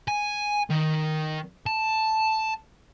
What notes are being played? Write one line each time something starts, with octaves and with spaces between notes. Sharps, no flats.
G#5
D#3
A5